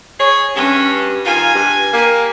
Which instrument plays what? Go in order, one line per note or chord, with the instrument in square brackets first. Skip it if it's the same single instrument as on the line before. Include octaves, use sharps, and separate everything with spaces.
[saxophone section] G#4 C#5
[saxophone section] G2 [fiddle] C#4
[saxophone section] D#3 F4 [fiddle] G#5
[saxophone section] G2
G3 A#3